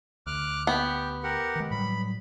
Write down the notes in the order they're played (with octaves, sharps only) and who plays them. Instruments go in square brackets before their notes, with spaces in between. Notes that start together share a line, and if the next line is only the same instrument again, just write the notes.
[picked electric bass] D2 [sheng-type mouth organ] D6 F6 F#6
[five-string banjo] B3 [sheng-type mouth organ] G4
[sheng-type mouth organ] G4 A#4 F#5
[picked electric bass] D#3 G#3
[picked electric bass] A2 F#3 G3 [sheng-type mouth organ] B5